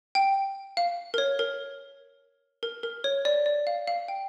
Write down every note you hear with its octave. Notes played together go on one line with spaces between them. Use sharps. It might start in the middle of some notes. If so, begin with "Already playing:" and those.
G5
F5
A#4
C#5
A#4
A#4
A#4
C#5
D5
D5
F5
F5
G5